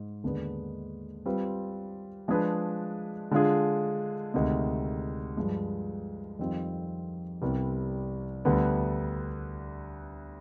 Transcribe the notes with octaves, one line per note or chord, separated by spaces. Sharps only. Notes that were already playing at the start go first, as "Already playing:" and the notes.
Already playing: G#2
D#2 D3 G#3 B3
G3 C4 F4 B4
F3 G#3 D4 G#4 B4
D3 G#3 D4 F4 G#4
D2 C3 D#3 G#3
G2 F3 G#3
F2 D#3 G3 C4 F4
C2 C3 G3 B3
D2 D3 G3 B3